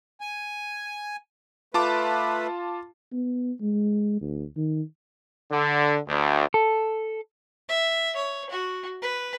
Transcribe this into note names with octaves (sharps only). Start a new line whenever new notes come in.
G#5
A3 F4 B4 A5 D6
B3
G#3
D2
D#3
D3
D2
A4
E5
C#5
F#4
B4